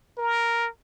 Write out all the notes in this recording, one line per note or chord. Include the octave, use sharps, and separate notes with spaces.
A#4